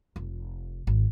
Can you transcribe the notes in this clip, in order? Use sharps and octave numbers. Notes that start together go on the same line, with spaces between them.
F1
G#1